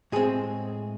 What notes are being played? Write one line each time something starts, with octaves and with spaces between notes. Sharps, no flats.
A2 G#3 C4 G#4